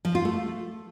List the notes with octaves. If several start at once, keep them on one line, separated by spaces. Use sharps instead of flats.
F3
F4
A3